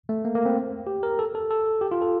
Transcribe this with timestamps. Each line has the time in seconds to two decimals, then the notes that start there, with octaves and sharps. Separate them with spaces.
0.09 A3
0.25 A#3
0.35 A#3
0.45 C4
0.87 G4
1.03 A#4
1.19 A4
1.35 A4
1.50 A4
1.81 G4
1.91 F4
2.01 A4